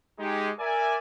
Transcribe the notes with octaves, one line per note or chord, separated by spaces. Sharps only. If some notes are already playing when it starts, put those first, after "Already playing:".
G#3 D#4 G4
A#4 D5 E5 G#5